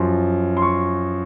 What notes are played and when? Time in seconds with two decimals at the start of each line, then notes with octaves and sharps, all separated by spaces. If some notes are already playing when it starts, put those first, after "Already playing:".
Already playing: F#2 F3 C6
0.57 C6
0.62 C#6